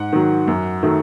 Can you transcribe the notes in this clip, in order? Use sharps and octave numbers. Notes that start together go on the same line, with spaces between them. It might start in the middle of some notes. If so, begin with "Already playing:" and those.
Already playing: G#2 F#5
D#3 F#3
F#2
D#3 F#3 A3